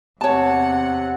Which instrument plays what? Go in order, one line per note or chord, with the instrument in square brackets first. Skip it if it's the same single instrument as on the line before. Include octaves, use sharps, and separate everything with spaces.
[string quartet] E2 C3 F#5 [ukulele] C#5 A5